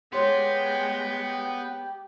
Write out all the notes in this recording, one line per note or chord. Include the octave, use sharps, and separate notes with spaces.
G#3 B3 G4 C#5 G5 C6